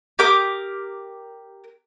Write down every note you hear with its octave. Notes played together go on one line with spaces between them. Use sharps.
G4 A#4 D6 D#6